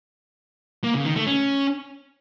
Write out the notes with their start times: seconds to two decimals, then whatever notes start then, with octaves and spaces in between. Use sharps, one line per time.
0.84 A#3
0.95 C#3
1.05 D#3
1.16 A3
1.27 C#4